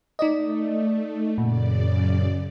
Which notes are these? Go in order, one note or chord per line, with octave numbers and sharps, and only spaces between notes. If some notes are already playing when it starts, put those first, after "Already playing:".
A3 D#4 D5 D#5
F#2 A#2 C#3 D5